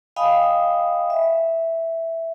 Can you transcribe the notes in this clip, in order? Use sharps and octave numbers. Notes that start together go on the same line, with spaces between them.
D#5 F5 G5 G#5 B5 D#6
E5